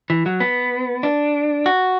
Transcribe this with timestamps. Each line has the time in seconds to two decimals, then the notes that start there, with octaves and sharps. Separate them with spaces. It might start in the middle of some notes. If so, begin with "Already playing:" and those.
0.10 E3
0.26 F#3
0.40 B3
1.03 D4
1.66 F#4